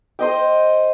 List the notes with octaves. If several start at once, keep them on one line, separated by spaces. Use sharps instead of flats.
C5 D#5 G5